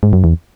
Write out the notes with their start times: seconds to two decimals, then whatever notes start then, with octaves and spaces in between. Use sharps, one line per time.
0.03 G#2
0.13 F#2
0.24 E2